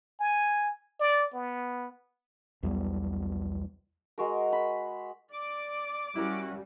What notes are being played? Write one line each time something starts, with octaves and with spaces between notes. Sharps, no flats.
G#5
D5
B3
B1 E2 G3 B3
G#3 F#4 A#4
B5
D5 D6
G3 C#4 E4 F#4 A#4